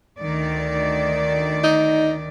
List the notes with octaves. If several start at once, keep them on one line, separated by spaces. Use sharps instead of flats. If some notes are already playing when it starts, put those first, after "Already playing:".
D2 D#3 D5
D#4